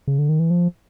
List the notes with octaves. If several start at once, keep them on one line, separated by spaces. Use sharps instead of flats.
C#3
D3
D#3
E3
F3